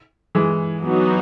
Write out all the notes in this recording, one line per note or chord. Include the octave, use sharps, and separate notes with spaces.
E3 G#3
F#3 B3 D#4 F#4